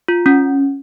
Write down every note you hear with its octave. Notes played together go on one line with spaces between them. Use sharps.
F4
C#4